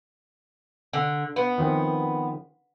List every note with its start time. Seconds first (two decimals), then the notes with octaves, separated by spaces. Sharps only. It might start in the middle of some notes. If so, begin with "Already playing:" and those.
0.93 D3
1.36 B3
1.58 D#3 F3 C4